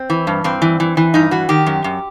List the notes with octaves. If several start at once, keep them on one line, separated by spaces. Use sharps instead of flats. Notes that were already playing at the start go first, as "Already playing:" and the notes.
Already playing: C4
E3
G2
G2 C4
E3
E3
E3
G2 D#4
E3 F#4
D#3 G4
F#2
F#2